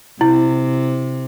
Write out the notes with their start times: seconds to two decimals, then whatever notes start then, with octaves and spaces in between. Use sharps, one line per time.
0.21 C3 E4